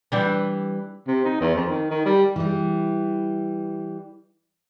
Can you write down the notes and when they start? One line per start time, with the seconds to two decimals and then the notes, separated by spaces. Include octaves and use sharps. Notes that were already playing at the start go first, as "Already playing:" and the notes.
0.12 E3 G3 D4
1.08 C3
1.25 D#4
1.41 E2
1.56 F2
1.69 D#3
1.91 D#3
2.06 G3
2.36 E3 G3